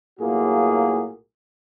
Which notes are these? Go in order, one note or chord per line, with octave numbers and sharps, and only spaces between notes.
B1 A2 A#3 F4 F#4 G#4